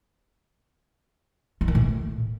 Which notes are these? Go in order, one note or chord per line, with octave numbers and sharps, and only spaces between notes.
G#3
D#3
A2